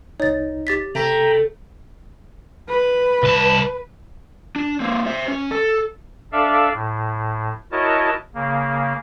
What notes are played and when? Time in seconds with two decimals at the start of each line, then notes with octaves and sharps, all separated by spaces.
0.20 C2 D#4 C#5 A6
0.67 G4 A6 B6
0.95 C3 A3 G5 A#5 B5
2.68 B4
3.23 C2 A5
4.56 D4
4.80 A#3 C4
5.06 C5 E5
5.28 C#4
5.51 A4
6.32 D4 A4 D5 E5 F5
6.72 A2
7.72 E4 F#4 A#4 C#5 D#5 A5
8.35 C#3 A#3